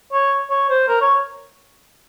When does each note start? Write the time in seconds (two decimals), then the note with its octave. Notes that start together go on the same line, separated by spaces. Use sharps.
0.13 C#5
0.50 C#5
0.69 C5
0.88 A#4
1.01 C#5